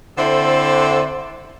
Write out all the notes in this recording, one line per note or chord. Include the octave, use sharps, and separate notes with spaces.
D3 C4 E4 A4 C5